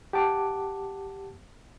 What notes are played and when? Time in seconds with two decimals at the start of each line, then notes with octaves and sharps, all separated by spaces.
0.13 G4 F#5 A5 D6